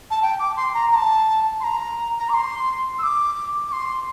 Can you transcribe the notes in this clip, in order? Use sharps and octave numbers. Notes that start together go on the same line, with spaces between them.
A5
G5
D6
C6
A#5
A#5
A5
C6
A#5
A#5
D6
C6
E6
D6
D6
C6